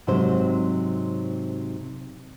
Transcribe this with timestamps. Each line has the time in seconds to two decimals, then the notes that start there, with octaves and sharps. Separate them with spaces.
0.07 G#2 C3 F#3 C4 C5